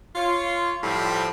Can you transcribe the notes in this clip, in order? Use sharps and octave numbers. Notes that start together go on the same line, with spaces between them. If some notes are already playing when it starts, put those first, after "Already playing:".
F4 C#5
A2 F3 G3 C4